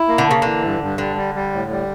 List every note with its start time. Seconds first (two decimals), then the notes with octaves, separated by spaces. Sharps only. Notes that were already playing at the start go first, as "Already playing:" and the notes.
Already playing: E4
0.08 A#3
0.18 D3
0.27 C#3 A#3
0.42 D3 E3
0.63 G2
0.81 G2
0.98 D3 G3
1.16 G3
1.35 G3
1.53 A2
1.70 G3